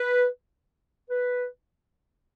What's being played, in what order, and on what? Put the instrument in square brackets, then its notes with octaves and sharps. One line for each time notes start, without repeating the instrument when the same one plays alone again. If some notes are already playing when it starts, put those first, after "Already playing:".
Already playing: [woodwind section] B4
B4